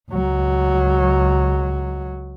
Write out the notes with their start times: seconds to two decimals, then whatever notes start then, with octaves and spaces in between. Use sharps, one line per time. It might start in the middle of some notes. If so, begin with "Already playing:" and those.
0.11 C#2 F#3